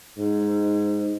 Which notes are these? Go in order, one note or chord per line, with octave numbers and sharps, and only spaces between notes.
G#2